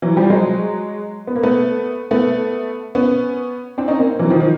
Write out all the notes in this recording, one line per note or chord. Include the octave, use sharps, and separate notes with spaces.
E3 F#3
F3 G3
F#3 G#3
B3
A#3
A3 B3
A3 B3
B3 C#4
C4 D4
C#4 D#4
A#3 C4
E3 F#3
D#3 F3
D#3 F3